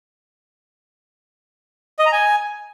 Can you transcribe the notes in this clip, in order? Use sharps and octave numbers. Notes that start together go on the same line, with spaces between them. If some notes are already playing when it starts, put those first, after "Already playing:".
D#5
A#5
G#5